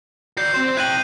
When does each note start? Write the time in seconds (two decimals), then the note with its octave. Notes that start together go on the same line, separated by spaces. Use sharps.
0.37 F#4 D5 G6 C7
0.54 C4 C5
0.77 E4 G5 F#6 D#7 F#7